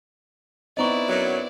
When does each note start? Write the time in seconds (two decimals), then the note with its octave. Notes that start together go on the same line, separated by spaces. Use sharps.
0.77 B3 C4 D#4 E4 D5 D#5 A#5 C#6
1.09 F#2 F#3